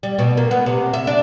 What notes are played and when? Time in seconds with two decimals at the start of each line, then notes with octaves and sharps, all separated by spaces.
0.03 G3
0.19 B2
0.37 A#3
0.51 B3
0.66 C3
0.93 E5
1.07 D4